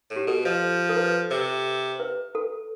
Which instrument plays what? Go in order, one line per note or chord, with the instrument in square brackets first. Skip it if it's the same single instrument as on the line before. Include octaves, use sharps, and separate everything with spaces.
[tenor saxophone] A2
[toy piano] G4
[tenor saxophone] B2 [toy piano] A4
[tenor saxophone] F3
[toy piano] A4
B4
[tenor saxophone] C3
[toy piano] B4
A4